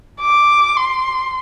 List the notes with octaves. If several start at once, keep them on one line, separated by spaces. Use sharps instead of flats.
D6
C6